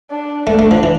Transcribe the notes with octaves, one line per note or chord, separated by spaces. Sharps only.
D4
A3 D4
A3
F3
E3